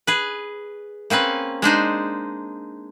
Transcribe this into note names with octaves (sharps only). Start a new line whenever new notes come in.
G#4 B4
A#3 C4 C#4 B4
G#3 D4 D#4 C5